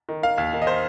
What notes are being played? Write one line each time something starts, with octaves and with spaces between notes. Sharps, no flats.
D#3
D#3 F5
D#2
D#3
D#5
C5